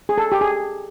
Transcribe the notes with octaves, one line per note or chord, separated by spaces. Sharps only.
G#4
A4
G4
G#4